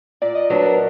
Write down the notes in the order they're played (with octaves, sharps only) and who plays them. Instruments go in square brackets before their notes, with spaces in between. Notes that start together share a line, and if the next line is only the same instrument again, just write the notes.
[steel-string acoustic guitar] A#2 [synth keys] D5
[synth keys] D#5
[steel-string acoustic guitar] F#3 B3 D4
[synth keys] A#4